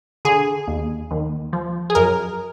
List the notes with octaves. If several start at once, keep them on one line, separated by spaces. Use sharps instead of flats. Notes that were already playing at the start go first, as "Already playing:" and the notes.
D3 G#4
D#2
D#2
F3
G#4
F#2 A#4